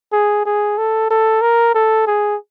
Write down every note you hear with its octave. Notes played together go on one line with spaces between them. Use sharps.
G#4
G#4
A4
A4
A#4
A4
G#4